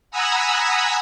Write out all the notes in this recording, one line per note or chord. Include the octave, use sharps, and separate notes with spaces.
F#5 G#5 A#5 B5 D#6 E6